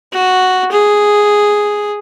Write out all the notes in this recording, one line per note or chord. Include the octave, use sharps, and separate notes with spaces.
F#4
G#4